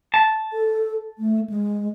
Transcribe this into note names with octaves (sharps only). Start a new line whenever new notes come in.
A5
A4
A3
G#3